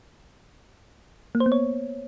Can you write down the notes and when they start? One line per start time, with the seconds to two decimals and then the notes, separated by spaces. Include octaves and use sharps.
1.35 A#3
1.40 C5
1.46 B3
1.52 C#5